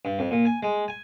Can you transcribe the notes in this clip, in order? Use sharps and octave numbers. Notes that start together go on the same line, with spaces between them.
G2
F2
A#2
G#5
G#3
G#5